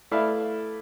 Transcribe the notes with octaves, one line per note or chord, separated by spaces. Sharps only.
A3 E4 B4 D5 F5